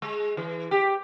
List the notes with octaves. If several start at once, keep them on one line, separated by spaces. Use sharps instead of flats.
G#3
E3
G4